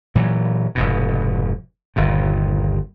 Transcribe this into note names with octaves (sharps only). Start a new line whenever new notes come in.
A#2 E3 F#3
F1 G#2 B2
G1 D#2 A#2